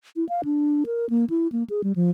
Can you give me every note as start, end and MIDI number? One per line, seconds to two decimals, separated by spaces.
0.16 0.27 64
0.29 0.42 77
0.45 0.84 62
0.86 1.08 70
1.10 1.25 58
1.30 1.48 64
1.52 1.63 58
1.70 1.82 68
1.84 1.92 55
1.96 2.11 53